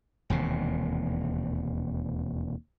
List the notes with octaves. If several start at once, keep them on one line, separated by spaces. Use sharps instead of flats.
E1 D#2 C3